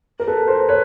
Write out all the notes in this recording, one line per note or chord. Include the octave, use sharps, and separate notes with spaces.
A#4
A4 B4
A#4 C5
B4 C#5